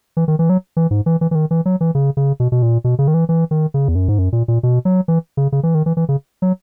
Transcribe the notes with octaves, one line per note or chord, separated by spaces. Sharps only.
E3
D#3
E3
F#3
E3
G#2
E3
E3
E3
D#3
E3
F#3
E3
C#3
C#3
B2
B2
A#2
B2
C#3
D#3
E3
E3
D#3
C#3
E2
F#2
G#2
F#2
A#2
A#2
B2
F#3
E3
C#3
C#3
E3
D#3
E3
E3
C#3
F#3